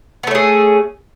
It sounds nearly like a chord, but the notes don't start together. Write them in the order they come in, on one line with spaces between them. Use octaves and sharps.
B3 A3 C#4 G#4